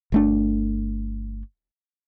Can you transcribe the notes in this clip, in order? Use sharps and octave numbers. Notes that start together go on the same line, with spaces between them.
G1 A3 D4